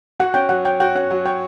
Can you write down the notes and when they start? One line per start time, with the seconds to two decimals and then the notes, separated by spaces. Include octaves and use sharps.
0.20 F#4 F#5
0.34 C#4 G5
0.49 F#3 F#5
0.65 C#5 G5
0.80 F#4 G5
0.95 C#4 F#5
1.11 F#3 F#5
1.26 C#5 G5